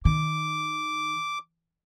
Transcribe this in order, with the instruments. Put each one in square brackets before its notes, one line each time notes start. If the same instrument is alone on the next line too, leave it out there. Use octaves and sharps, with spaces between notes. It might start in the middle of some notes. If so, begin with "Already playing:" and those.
[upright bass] D#3 [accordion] D6